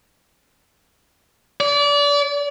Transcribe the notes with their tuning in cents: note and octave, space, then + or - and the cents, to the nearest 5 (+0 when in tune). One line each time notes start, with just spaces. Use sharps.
D5 -30